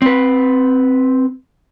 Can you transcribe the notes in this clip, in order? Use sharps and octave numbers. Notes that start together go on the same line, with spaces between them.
C4 B4